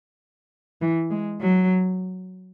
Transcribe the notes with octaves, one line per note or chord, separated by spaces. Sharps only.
E3
G#3
F#3